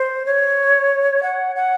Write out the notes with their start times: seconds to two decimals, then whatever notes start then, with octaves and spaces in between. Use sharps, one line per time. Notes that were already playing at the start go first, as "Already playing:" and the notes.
Already playing: C5
0.26 C#5
1.23 F#5
1.56 F#5